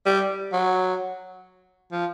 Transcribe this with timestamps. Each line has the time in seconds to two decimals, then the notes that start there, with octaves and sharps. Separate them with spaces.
0.06 G3
0.53 F#3
1.92 F3